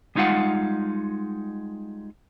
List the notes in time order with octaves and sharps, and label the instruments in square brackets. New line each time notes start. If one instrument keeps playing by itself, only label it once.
[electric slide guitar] G3 G#3 D#4 F4 F5 F#5